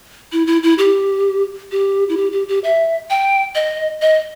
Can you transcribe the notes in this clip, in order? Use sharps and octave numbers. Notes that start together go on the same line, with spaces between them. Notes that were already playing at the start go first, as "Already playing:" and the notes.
E4
E4
E4
G4
G4
E4
G4
G4
G4
E5
G5
D#5
D#5